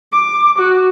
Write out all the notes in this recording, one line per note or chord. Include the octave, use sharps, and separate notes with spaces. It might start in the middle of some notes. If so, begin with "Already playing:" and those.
D6
F#4